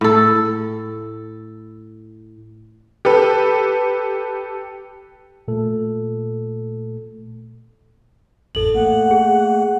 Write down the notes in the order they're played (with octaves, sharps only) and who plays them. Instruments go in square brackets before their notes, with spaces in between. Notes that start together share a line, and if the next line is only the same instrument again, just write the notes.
[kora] A2 A4
[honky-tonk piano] G4 A4 B4
[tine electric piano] A#2 A3 A4
[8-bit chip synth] A1 F2 A2 [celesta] A4 F#7
[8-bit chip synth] A3 A#3 [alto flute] F#5
[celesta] G#4